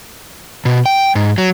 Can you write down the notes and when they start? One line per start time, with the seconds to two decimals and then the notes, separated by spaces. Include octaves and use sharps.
0.65 B2
0.86 G5
1.15 G#2
1.38 F#3